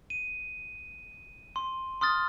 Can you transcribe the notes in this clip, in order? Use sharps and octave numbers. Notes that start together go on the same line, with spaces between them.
D#7
C6
C6 D#6 F6 A6